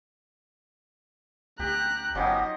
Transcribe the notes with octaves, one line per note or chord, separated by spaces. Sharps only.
D2 G4 A#5 F#6
G1 F3 F#3 B3 C#4 D#4 G4 D#5